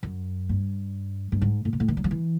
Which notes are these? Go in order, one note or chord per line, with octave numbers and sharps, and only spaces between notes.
F#2
G2
G2
G#2
A2
A#2
A2
D#3
F#3
F3
E3